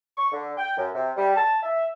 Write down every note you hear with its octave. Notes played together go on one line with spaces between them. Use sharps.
C#6
D3
G5
F#2
C3
G3
A5
E5